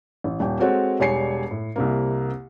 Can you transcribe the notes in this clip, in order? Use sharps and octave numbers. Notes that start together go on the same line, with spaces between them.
A1
D#1 G5
G#3 C4 F#4 A4 C#5 F#5
E1 G3 C#5 G#5 C7 C#7
A2
C2 C3 A#3